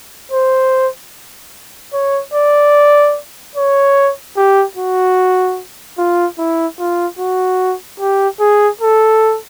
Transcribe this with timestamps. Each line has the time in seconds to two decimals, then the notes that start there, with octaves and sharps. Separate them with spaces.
0.32 C5
1.93 C#5
2.34 D5
3.56 C#5
4.37 G4
4.77 F#4
5.98 F4
6.39 E4
6.79 F4
7.19 F#4
8.00 G4
8.40 G#4
8.81 A4